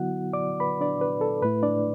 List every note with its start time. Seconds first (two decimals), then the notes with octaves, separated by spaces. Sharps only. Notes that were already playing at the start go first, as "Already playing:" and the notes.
Already playing: D3 F#3 B3 E4 F#4 F#5
0.33 D5 D6
0.60 B4 B5
0.81 D4 D5
1.01 B4
1.21 A4
1.42 A2 A3 E4 B4
1.63 D4 D5